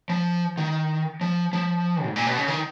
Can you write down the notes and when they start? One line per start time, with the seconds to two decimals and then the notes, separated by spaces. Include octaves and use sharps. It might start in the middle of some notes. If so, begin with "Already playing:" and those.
0.10 F3
0.57 D#3
1.21 F3
1.53 F3
2.05 G#2
2.16 A#2
2.27 B2
2.38 C#3
2.48 D#3